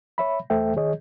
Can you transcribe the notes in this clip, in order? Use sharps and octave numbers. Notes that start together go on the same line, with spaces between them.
C#5 E5 B5
E2 A3 A4 C5 E5 G5
D#3 G#4 C#5 D#5